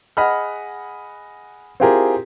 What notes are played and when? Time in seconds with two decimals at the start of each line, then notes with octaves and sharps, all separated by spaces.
0.17 G#4 D#5 F#5 B5 F6
1.80 C4 E4 F4 G4 G#4 A#4